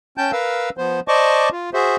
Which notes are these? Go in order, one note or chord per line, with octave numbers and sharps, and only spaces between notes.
C#4 G5 A5 G6
A#4 B4 F5 E6
F3 B3 C5
C5 D5 D#5 A5 C#6 D6
F4
F#4 G#4 C5 E5